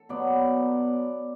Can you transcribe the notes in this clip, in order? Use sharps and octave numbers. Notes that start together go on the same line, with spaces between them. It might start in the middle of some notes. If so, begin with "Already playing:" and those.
Already playing: A4
B2 F#3 B3 D5